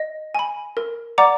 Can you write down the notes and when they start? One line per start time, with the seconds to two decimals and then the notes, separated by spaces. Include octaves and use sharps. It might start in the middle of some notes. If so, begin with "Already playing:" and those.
Already playing: D#5
0.35 G#5 B5
0.77 A#4
1.18 D5 F#5 A#5 D6